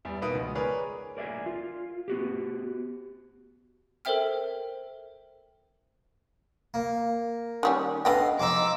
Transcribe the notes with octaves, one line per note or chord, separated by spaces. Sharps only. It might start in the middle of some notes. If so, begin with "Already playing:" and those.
E2 G3
B2 A#3 D#4 B4 D#6 D7
C#2
G#4 A#4 B4 C#5 D5
A#4 D5 E5 G5 G#5
F4
B3 F#4 G4
A4 A#4 C5 E5 G5 F6
A#3
D#3 G3 C#4
D3 B3 D#5 F5 G5
F3 D#4 D6 E6